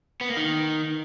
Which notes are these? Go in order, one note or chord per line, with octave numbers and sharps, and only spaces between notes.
B3
A#3
D#3